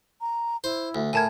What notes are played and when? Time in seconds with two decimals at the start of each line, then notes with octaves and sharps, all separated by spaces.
0.21 A#5
0.64 E4 C5
0.95 D2
1.13 A2 A#4 G#5 A5 G#6